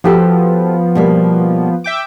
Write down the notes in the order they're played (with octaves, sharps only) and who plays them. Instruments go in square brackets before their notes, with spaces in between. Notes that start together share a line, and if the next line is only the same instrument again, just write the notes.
[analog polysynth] F3 B3 [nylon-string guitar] F#4 G4 A4
[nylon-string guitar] B2 G3 A#3
[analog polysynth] E5 G5 D6